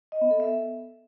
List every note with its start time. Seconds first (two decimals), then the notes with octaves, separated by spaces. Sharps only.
0.12 D#5
0.21 B3
0.31 A4
0.40 E5